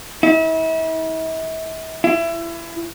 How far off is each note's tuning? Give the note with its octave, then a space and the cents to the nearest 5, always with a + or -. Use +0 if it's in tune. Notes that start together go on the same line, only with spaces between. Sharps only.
E4 -40
E4 +25